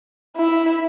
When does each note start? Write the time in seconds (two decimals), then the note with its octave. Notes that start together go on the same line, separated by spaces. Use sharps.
0.37 E4